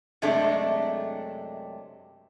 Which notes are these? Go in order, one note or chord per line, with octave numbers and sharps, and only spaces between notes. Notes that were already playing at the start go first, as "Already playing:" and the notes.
F#2 C3 G#3 A3 D4